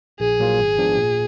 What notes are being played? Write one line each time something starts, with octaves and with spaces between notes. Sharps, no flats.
A#1 G#4
A#2 F#3 A#3 F4
G#1
G#2 F3 B3 D4
A#2